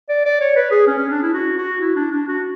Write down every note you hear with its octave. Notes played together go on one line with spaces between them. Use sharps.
D5
D5
C#5
B4
G#4
C#4
C#4
D4
E4
F#4
F#4
E4
D4
D4
F#4